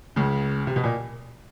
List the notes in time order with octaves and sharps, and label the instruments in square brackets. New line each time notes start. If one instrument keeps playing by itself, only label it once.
[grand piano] C#2 C#3
C3
B2
A#2